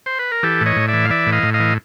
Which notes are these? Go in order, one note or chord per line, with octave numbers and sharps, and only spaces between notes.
C5
B4
A#4
E3 G4 A4
A2
C#5 D#5
A2
D5 E5
E3
F5
E3 D5 E5
A2
D#5 F5
A2
D#5 F5
E3